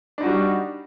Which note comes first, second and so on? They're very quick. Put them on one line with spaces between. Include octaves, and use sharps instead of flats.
D4 D#4 F#4 G3